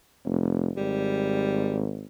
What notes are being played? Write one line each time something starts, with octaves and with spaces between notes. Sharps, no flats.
F1
G#1 G3